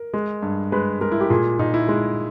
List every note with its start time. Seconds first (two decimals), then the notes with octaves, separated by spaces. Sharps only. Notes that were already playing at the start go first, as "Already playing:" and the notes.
Already playing: A#4
0.14 G#3
0.43 G2
0.72 G#3 B4
1.01 G#3 A#4
1.12 E4
1.21 G4
1.30 A#2 G#4
1.59 A#2 D#4
1.74 E4
1.89 G#3